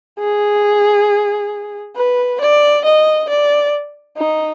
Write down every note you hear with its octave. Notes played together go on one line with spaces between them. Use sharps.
G#4
B4
D5
D#5
D5
D#4